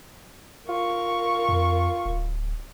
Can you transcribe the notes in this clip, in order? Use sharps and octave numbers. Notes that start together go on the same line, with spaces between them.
F4 A#4 C#6
F2
D1